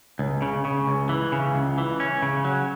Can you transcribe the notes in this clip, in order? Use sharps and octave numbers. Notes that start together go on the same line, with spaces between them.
C#2
C#3
C#3
C#2
E3
C#3
C#2
E3
C#4
C#3
F#3